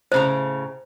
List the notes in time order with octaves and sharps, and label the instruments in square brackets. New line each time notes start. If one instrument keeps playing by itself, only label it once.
[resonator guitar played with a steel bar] A2 C#3 A#5 [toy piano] C5